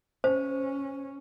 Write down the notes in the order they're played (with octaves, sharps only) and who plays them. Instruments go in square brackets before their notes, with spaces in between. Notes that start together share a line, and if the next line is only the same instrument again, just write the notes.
[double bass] C#4 [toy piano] C5